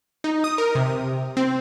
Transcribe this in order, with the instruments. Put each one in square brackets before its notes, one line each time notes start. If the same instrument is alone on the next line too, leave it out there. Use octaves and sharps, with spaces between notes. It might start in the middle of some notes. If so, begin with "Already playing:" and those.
[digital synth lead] D#4
D#6
A#4
C3
C4